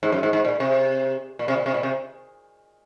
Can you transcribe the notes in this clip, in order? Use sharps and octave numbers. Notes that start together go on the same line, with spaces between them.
G#2
F#2
G#2
G#2
A#2
C3
A#2
C3
A#2
C3
A#2
C3